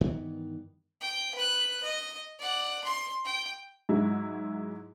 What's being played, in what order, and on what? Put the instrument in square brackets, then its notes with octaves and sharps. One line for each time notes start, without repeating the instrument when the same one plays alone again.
[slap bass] G2 D#3 E3 B3
[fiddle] G5
B4 F#6
D#5
D5 F#5
C6
G5
[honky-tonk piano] G#2 F#3 G#3 E4